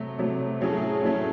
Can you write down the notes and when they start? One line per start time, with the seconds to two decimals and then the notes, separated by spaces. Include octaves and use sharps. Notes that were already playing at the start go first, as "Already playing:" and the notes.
Already playing: C3 F#3 A3
0.19 C3 F#3 A3
0.61 A2 F#3 A3 C#4 G#4
0.69 A4
0.77 G#4
1.03 A2 F#3 A3 C#4